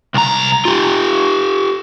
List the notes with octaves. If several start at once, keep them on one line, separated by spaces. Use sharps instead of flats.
C2 A#5
F4 G4